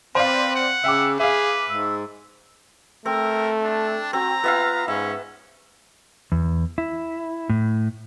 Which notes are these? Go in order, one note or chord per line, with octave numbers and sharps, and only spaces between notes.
C4 B4 C5 D5 F5
F#5
C#3 E5 G5 D6 E6
G#4 B4 E5 F5 D6
G#2 E6
A3 C4 A#4
D4
C4 F#4 A#5
B3 F4 E5 F5
G#2 C#4 E5
E2
E4
A2